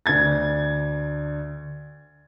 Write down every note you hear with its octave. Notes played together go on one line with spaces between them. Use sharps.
D2 D4 G#6 A6